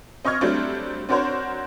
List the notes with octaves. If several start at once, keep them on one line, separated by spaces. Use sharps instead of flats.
C4 D#5 C#6 F6 G#6
F#3 G3 A3 C4 D4
C4 D4 F#4 A#4 C5 C#5